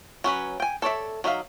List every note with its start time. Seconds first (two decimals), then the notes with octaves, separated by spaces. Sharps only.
0.24 F#3 C#4 B4
0.60 G5 G#5
0.82 A4 C#5 D5 E5
1.24 F#3 D#4 E5 F5